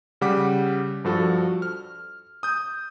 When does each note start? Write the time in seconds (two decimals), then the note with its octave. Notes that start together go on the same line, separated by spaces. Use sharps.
0.21 C#3 G3 F#5 D6 B6
1.04 G2 F3 F#4 A4
1.62 F6
2.43 D#6 G6